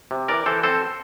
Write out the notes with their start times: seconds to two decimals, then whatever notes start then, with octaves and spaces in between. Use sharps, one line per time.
0.11 C3
0.28 E3 A#4 D5
0.46 E3 A4 C5
0.63 C4 A4 C5